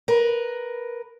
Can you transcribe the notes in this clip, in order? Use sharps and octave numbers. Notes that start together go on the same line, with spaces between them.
A#4 B4